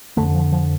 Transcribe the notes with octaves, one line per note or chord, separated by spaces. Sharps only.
F2 D3 A3
F3
F3